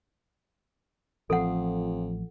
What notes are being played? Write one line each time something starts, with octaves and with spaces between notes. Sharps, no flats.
A1 F2 F3 A4 F#5